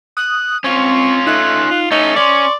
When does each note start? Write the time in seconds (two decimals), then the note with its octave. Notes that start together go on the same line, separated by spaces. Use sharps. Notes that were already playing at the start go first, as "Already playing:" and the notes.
0.17 D#6 F#6
0.64 C4 C#4 F4 C#6
1.27 A3 D#4 F#6
1.71 F4
1.91 A3 C#4 D#4 C#6
2.16 C#4 D5 C6